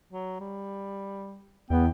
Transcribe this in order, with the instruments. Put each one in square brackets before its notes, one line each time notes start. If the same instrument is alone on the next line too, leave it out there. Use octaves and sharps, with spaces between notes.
[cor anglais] F#3
G3
[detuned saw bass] E2 [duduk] B3 [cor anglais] G5